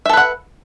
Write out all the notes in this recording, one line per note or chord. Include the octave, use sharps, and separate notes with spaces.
A4 B4 E5 F#5